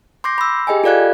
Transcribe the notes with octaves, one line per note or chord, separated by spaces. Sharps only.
C6 D6 G6 A#6 C7
B5 E6
G4 G#4 D#5 G5 G#5
F4 A4 D5 F5 F#6 G#6